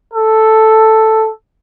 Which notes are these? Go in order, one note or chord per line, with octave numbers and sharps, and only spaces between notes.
A4